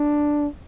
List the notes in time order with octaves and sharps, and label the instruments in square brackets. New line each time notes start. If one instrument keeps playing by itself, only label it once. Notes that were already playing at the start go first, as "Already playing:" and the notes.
Already playing: [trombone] D4